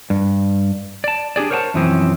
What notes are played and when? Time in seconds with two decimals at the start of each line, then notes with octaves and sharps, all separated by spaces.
0.10 G2
1.04 D5 A5
1.36 D4 G4 G#4 D5
1.51 A#4 C5 C#5 F#5 G5 A5
1.74 F#2 B2 E3 F3 C4 C#4